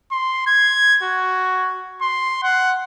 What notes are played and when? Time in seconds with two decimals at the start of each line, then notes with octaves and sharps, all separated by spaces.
0.12 C6
0.47 G#6
1.03 F#4
2.01 C6
2.43 F#5